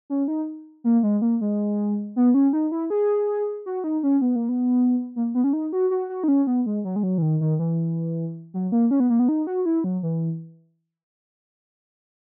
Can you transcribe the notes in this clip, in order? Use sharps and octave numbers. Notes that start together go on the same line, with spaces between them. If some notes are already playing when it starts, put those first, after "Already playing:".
C#4
D#4
A#3
G#3
A#3
G#3
B3
C#4
D#4
E4
G#4
F#4
D#4
C#4
B3
A#3
B3
A#3
B3
C#4
D#4
F#4
F#4
F#4
D#4
C#4
B3
G#3
F#3
G#3
F#3
E3
D#3
D#3
E3
F#3
A#3
C#4
B3
A#3
B3
D#4
F#4
E4
F#3
E3